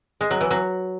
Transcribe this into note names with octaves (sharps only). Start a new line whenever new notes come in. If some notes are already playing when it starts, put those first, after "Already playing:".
G#3
F#3
E3
F#3